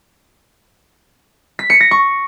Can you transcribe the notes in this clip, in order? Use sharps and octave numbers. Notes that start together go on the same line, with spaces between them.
B6
C#7
A#6
C#6